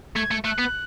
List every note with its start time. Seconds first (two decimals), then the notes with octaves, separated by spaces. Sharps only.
0.16 A3 G#6
0.31 A3
0.45 A3 F#6
0.59 B3